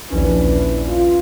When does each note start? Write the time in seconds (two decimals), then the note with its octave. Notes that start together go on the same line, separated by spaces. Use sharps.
0.10 A#1 D#2 C#4 D4 E4 B4
0.87 F4